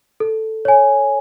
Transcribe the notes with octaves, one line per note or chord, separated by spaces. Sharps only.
A4
C#5 G#5